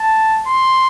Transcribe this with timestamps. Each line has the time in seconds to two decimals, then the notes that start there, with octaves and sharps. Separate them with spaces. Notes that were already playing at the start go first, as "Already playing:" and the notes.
Already playing: A5
0.47 C6